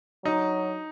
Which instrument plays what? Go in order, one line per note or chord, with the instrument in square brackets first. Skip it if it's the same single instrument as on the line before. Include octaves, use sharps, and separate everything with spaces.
[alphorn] F#3 [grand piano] D#4